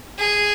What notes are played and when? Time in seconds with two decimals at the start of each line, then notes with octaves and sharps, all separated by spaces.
0.19 G#4